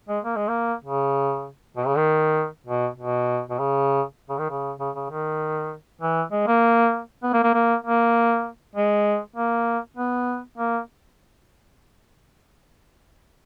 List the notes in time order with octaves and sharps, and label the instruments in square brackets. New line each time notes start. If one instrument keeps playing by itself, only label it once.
[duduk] G#3
A#3
G#3
A#3
C#3
B2
C#3
D#3
B2
B2
B2
C#3
C#3
D#3
C#3
C#3
C#3
D#3
E3
G#3
A#3
B3
A#3
A#3
A#3
A#3
G#3
A#3
B3
A#3